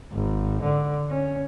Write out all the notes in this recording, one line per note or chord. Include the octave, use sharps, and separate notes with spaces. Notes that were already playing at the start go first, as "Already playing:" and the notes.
G#1
D3
C#4